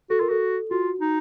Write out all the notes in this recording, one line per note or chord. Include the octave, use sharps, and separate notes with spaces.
F#4 A4
F4 A#4
F#4 A4
F4 F#4
D#4